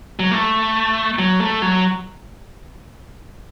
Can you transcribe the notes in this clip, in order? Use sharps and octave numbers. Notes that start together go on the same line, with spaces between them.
F#3
A3
F#3
A3
F#3